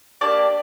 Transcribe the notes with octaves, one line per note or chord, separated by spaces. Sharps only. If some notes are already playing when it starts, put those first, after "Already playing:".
A#3 D4 G4 D5